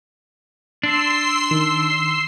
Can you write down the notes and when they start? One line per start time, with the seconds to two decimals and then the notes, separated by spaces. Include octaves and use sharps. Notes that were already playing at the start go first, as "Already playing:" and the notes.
0.83 D4 C6 E6 C7
1.51 D#3